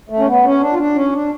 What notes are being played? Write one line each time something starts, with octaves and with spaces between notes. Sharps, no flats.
A3
C#4
B3
C#4
D4
F4
D4
C#4
D4